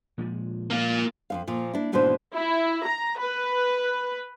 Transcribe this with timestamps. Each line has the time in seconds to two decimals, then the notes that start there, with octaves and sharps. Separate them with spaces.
0.18 A#2 F3 G#3
0.70 A#3 F4
1.30 F2 G#2 F5
1.47 A#2 F3
1.73 D4 E4
1.92 D#2 G#2 B2 E3 D4 C5
2.34 E4
2.83 A#5
3.19 B4